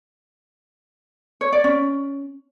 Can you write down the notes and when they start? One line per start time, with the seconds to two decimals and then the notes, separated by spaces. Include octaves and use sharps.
1.41 C#5
1.53 D5
1.64 C#4